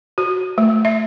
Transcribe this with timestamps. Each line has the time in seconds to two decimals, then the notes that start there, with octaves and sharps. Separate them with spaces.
0.18 F#4
0.58 A3
0.85 E5